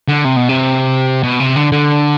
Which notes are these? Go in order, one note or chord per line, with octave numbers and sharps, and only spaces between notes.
D3
C3
B2
C3
B2
C3
D3
D3